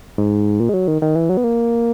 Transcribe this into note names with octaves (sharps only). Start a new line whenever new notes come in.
G#2
A#2
G#3
F#3
D#3
D#3
E3
F#3
B3
A#3